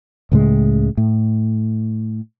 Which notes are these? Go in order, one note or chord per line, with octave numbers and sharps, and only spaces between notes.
C#2 A2 C#3 G#3
A2